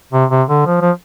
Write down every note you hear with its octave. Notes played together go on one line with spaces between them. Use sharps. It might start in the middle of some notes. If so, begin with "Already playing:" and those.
C3
C3
D3
F3
F3